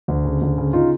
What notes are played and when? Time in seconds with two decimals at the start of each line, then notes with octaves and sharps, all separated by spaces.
0.08 D2
0.25 C#3
0.42 D2
0.58 C#3
0.73 D#4 F4